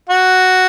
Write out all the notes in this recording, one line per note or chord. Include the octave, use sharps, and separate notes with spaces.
F#4